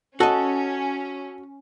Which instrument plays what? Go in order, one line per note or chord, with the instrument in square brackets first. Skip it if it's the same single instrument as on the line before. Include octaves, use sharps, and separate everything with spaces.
[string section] C#4 [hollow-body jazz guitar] F#4 D#5 [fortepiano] A4